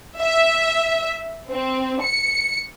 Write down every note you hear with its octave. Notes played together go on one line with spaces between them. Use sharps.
E5
C4
C#7